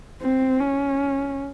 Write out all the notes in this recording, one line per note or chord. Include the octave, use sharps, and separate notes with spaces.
C4
C#4